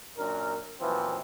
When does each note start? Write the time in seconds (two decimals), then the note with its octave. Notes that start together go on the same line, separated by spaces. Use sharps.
0.18 F#2 A#2 D4 A#4
0.80 F#2 A#2 E3 F3 B3 C4